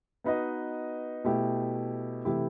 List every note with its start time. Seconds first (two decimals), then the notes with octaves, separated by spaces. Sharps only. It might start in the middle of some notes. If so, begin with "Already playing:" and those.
0.24 B3 D#4 F#4 B4 D#5
1.24 B2 A3 E4 G4
2.25 C3 E3 A3 E4 G4